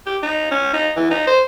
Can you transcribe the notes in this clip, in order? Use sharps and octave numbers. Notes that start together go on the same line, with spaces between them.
G4
D#4
C#4
D#4
E3
D#4
C5